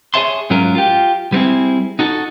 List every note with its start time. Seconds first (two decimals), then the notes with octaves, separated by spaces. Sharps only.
0.14 G#4 A4 C#5 E5 A5 C6
0.50 G#2 F#3 C#4 F4 A#4
0.75 F4 G4
1.32 G3 B3 C4 E4 G#4
1.99 D#4 F#4 A4